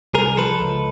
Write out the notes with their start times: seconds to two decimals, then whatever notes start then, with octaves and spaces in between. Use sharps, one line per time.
0.14 C2 G#4 A#4
0.37 F3 A4 B4
0.61 C#2